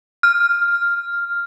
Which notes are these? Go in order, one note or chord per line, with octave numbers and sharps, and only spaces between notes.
F6